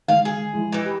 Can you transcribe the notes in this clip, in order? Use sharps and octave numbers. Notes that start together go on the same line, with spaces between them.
D#3 G#3 F5
G#4
F3 G#3 E4
E3 D#4
G4